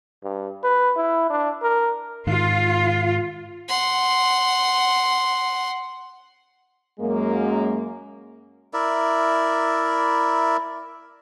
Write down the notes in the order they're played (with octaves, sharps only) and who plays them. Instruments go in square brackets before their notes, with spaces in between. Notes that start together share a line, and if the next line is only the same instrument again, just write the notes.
[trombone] G2
B4
E4
D4
A#4
[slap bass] G#2 D#3 [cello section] F4
[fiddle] F#5 C6
[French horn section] F#2 G#3 A#3
[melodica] E4 A#4 D5 E5